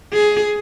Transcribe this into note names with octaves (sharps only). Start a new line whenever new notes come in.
G#4